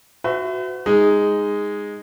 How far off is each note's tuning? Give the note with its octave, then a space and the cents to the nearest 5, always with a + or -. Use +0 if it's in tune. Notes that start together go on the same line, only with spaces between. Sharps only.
F#4 +0 B4 +45 E5 +10
G#3 -10 D#4 +0